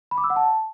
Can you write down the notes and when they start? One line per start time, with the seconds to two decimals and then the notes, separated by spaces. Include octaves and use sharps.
0.11 B5
0.18 D6
0.24 E6
0.30 F#5
0.36 A5